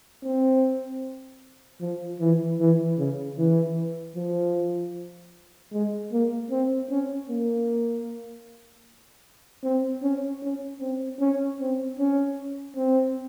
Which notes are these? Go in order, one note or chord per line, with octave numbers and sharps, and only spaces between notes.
C4
F3
E3
E3
C#3
E3
F3
G#3
A#3
C4
C#4
A#3
C4
C#4
C#4
C4
C#4
C4
C#4
C4